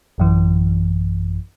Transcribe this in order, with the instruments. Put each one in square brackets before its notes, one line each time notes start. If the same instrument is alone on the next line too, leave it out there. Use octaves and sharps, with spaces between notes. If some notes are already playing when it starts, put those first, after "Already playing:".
[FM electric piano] A1 F#2 E3